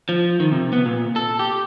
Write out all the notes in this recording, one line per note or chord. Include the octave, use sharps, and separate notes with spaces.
F3
D#3
C3
B3
A#2
A4
G4